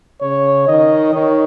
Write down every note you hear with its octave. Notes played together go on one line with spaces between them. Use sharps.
C#3 C#5
D#3 D#5
D#3 C#5